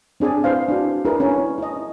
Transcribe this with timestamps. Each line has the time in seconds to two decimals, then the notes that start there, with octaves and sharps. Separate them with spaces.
0.20 C4 D4 G#4 D5 G#5
0.44 E4 B4 C5 F5
0.68 D4 F#4
1.05 D4 E4 G#4 A#4 B4
1.20 C#4
1.58 E4 D#5